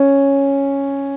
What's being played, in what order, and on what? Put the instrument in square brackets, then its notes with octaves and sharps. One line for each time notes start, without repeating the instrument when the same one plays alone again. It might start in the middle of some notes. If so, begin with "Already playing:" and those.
Already playing: [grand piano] C#4